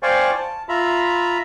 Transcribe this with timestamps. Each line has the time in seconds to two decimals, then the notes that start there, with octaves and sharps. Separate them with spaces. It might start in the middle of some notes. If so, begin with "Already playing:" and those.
0.03 C5 D5 F5 G5 G#5 C#6
0.35 A5
0.69 F4 E5 A#5 B5